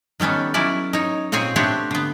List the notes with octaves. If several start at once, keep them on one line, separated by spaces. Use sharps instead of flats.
D#3 G3 B3 C#4 A4
F#3 C#4 E4 D5
D#4 C#5
A#2 C4 G#4 C#5 G#5
A3 B3 C4 D4 G4 C#5
D3 B3